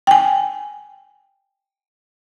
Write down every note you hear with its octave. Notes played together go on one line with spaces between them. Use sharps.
G5 G#5